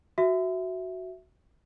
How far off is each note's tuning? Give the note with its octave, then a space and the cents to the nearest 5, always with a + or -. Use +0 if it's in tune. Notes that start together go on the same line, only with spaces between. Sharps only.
F#4 +0 E5 +0